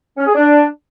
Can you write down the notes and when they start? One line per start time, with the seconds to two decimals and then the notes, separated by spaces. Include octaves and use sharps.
0.17 C#4
0.26 G#4
0.35 D4